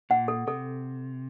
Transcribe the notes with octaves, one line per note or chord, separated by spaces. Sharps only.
A#2 F#5
A4
C3 A4